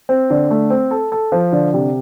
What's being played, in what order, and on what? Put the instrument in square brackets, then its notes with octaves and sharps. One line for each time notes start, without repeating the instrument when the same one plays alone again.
[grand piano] C4
D3
A3
C4
A4
A4
F3
D3
C3